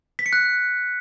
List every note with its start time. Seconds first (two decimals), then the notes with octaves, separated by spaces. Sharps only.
0.19 B6
0.26 C#7
0.33 F#6